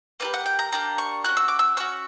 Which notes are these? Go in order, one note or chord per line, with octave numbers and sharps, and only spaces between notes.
A#3 D4 G4 B4
F#5
G5
A#5
A#3 D4 G4 A#5
C#6
C#4 F#4 F#6
E6
D6
E6
C#4 F#4 E6